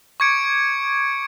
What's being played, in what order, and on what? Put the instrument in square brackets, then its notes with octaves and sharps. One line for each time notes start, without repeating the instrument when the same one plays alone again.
[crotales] C#6 D6 G#6 C#7 D7